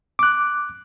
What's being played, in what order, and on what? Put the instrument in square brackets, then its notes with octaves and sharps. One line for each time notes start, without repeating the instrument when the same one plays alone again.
[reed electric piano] D6 F#6